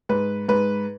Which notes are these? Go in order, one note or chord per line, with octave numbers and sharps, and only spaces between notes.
G#2 B4
G#2 B4